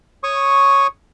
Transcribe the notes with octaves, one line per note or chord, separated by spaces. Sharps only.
C#5 C#6 D#6